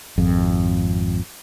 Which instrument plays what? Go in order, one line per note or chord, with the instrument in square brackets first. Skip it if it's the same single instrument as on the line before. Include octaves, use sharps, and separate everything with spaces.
[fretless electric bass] G#1 F2